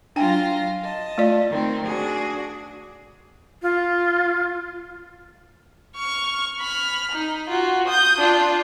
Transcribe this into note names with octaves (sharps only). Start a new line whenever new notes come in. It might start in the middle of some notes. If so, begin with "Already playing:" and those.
F#3 D4 F4 G5 G#5 A#6
D#5 A5
A3 F4 D5
D#3 C4
D4 F#4 G#4
F4
C#6 F6
B5 F6
D#4
F4 F#4
D#6 G6
D4 F4